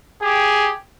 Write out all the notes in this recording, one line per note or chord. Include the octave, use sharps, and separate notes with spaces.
G4 G#4